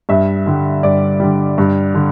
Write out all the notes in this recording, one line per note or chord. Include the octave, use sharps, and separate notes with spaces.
G2 E5
D3 G3
G2 D5
D3 G3
G2
D3